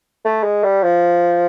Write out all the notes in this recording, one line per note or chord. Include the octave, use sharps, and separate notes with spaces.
A3
G#3
G3
F3